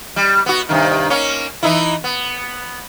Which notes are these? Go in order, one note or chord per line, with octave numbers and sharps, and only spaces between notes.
G3
B3 F#4
G2 C3 D#3
A#3 C#4
E3 D#4 E4
B3